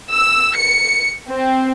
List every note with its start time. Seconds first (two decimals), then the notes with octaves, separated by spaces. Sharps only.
0.13 E6
0.57 C#7
1.29 C4